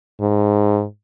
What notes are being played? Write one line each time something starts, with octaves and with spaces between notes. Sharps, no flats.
G#2